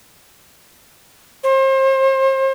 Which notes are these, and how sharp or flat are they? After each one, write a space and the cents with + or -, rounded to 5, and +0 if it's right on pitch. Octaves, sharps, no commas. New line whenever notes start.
C5 +35